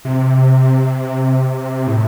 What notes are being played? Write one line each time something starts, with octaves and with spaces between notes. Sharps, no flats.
C3
A2